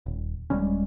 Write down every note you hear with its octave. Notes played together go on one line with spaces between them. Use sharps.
D#1
D#1 G3 G#3 C#4